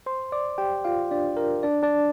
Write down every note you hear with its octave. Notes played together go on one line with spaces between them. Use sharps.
C5 C6
D5 D6
G4 G5
F4 F5
D4 D5
A#4
D4 D5
D4 D5